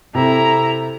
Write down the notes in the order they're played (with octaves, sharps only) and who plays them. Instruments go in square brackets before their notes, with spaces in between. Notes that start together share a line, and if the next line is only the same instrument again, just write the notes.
[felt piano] C3 A4 [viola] E4 A#5